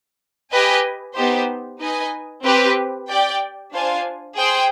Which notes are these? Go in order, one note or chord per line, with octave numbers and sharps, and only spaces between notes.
G4 B4 D#5 G#5
B3 D#4 G4 C5
D#4 B4 D#5 G#5
C4 G4 B4
G4 D5 G5
D4 F4 C5 F5 G#5
G#4 C5 G5